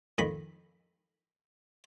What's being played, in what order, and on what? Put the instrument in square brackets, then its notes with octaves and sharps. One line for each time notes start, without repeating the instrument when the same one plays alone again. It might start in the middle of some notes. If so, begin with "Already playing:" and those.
[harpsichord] F2 D#3 B5